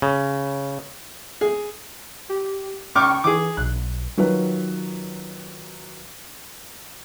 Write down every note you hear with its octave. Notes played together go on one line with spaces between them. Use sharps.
C#3
G#4
G4
C#2 G5 C#6 D6 F6
E3 G#4 D6
B1 B2 F#6
D#3 F#3 F4 B4